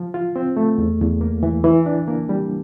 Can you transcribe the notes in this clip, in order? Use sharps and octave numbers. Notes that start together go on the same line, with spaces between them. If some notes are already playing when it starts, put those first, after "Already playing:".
Already playing: F3
F4
C4
A3
E2
E2
A#3
E3
E3
D4
A#3
G3